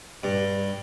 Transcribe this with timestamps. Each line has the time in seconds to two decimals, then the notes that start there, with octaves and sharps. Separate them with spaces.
0.23 G2